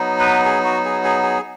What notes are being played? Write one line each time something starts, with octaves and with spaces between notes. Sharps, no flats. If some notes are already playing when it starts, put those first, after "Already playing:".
Already playing: F#3 B3 D#4
B4
G#4
F#4
G#4
G#4
G#4